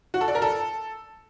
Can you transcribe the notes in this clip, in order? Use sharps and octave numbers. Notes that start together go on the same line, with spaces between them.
F#4
A4
D5
A#4
A4